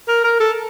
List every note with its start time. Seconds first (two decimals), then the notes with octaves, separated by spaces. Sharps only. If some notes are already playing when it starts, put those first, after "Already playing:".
0.08 A#4
0.24 A#4
0.40 A4